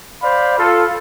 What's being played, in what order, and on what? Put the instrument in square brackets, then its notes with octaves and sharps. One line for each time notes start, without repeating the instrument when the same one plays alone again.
[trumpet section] C5 D5 F5 B5
F4 A4